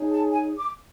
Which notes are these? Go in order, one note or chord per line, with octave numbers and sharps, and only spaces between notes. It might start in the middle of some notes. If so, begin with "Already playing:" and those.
Already playing: D#4 G#4 C#5
A5
G#5
D6